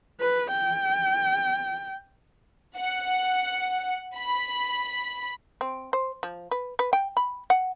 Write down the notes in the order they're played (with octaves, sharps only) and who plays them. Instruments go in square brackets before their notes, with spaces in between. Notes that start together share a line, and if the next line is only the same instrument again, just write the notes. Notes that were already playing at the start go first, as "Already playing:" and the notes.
[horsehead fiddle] B4
G5
[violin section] F#5
B5
[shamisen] C4
C5
F3
B4
B4
G5
B5
F#5